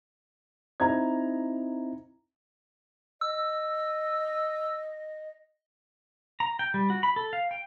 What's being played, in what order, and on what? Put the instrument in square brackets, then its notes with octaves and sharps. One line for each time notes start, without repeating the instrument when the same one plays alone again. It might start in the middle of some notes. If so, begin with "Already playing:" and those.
[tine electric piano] C4 D#4 E4 [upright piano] A#5 G#6
[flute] D#5 [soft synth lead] E6
[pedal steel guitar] A#5
G5
G3
F#4
B5
A4
F5
G5